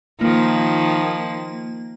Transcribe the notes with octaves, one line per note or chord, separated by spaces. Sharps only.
D#3 F3 A#3